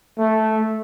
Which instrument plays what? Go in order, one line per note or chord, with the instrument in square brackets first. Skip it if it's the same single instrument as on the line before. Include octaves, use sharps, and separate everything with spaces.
[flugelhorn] A3